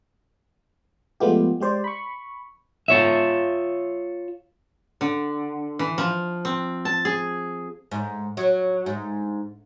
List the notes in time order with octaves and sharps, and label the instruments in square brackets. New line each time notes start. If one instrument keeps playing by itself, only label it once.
[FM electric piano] F3 G#3 A3 B3 F4 G4
G#3 G4 C5 D5
B5 C#6
[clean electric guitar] F4 C#5 E5
[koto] D3
E3
F3
C4
A5
G#4
[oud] G#2
F#3
G#2